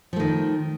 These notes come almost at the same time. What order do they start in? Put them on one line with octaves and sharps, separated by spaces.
F3 A3 D#3